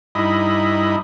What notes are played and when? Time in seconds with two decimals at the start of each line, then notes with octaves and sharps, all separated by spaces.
0.15 G2 D#4 E4 D#5 B5